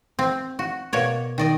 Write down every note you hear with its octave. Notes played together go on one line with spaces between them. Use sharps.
C4
F#4
B2 A#3 C#5 D5
D#3 D5 D#5